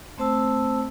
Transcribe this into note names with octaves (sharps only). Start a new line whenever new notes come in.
A3 C4 C5 A5 E6